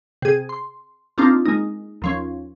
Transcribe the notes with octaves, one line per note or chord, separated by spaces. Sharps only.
C3 G#4
C6
A#3 C4 D4 D#4 F4 A5
G#3 A#3 D#4
D#2 F3 C#4